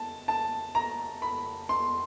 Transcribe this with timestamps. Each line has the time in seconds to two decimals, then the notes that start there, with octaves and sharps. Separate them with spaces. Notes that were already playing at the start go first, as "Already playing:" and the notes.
Already playing: A5
0.28 A5
0.75 A#5
1.22 B5
1.69 C6